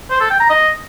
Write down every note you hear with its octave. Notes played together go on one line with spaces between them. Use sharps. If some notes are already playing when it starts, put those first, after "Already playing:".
C5
A4
G5
A#5
D#5